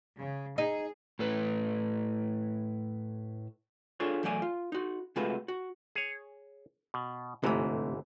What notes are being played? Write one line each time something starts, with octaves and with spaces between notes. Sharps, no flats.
C#3
D#4 G#4
A2 A4 B4
D4 F4 G#4 A4 C#5
E2 F#3 A3 D5 F#5 G#5
F4
D#4 F#4
C3 G#3 A3 F4 F#4 B4
F#4
G#4 C#5
B2
G1 G#2 C3 E3 A3